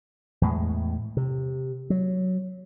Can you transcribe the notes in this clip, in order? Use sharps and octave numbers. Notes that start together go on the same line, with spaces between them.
E2 A2 G#3
C3
F#3